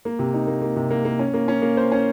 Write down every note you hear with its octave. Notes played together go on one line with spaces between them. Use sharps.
A#3
C3
D#4
A#3
A#3
C3
A#3
A#3
C#4
A#3
C#4
A#3
C5
C#4